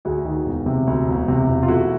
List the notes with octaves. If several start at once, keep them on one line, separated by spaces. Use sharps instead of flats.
D2 F#4 G#4
D#3
E1
C3
D2
E1
C3
E1
F4
A3 E4 F#4